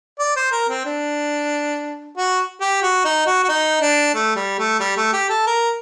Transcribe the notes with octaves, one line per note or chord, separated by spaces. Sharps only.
D5
C5
A#4
C4
D4
F#4
G4
F#4
D#4
F#4
F#4
D#4
D4
A3
G3
A3
G3
A3
G4
A4
A#4